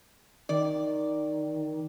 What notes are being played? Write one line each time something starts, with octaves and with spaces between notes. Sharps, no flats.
D#3 D5